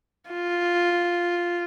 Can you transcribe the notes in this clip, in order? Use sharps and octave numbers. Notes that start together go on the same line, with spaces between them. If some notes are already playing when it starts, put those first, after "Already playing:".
F4